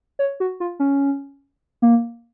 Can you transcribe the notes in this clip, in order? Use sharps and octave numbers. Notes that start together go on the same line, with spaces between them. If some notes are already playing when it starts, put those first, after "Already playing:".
C#5
F#4
F4
C#4
A#3